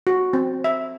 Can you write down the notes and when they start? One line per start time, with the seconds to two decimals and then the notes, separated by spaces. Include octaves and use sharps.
0.07 F#4
0.33 C4
0.64 E5